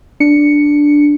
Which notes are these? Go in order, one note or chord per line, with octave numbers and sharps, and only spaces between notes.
D4 C#7